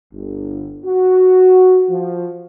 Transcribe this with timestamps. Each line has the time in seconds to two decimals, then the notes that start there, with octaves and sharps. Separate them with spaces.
0.13 G1
0.85 F#4
1.90 F3